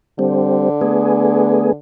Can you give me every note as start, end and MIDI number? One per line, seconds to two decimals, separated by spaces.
0.19 1.76 50
0.19 0.69 55
0.19 0.69 60
0.81 1.72 57
0.81 1.72 59
0.81 1.72 68